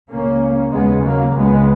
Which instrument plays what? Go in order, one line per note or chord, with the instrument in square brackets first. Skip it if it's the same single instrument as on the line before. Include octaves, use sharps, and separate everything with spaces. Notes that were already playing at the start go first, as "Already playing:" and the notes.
[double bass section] C#2 C#3 A#3 C#4
D#2 C#3 G#3 B3
F#3 A#3
C#2 C#3 G#3 B3